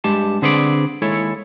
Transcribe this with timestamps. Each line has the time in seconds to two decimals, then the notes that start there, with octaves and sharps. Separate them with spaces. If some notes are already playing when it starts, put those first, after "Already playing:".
0.04 G2 G#3 G4 A5
0.42 D3 C4 G#4 B4 C5 D5
1.02 D#2 G#3 E4 A4 C#5